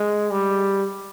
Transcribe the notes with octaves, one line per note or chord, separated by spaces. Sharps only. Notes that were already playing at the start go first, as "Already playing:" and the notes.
Already playing: G#3
G3